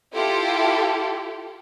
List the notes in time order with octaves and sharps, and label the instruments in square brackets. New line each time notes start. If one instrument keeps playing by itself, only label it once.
[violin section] E4 F4 G4 A4